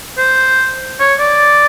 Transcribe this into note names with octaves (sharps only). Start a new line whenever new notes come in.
C5
C#5
D5